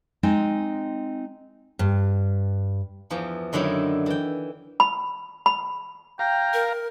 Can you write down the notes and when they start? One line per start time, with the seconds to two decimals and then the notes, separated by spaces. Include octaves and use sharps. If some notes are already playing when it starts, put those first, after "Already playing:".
0.23 G#3 C4 D#4 D#5 G5 G#5
1.79 G2
3.10 E2 E3 F3
3.53 F#2 D3 D#3 F#3 E4
4.06 E3 G5
4.80 B5
5.46 B5
6.19 F5 G5 A#5
6.53 A#4